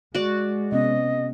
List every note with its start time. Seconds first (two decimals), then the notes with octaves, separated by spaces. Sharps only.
0.15 G#3 F#4 D5
0.72 C3 B3 C#4 D#5